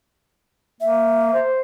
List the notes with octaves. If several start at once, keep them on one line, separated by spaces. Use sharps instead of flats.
A#3 E5
C5